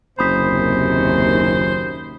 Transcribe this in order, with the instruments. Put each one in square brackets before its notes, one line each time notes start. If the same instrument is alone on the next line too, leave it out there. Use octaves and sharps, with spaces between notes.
[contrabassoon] F#1 [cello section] D#2 C3 D#3 [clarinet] C5 [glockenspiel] B5 D#6 B6